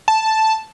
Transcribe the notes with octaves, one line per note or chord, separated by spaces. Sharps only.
A5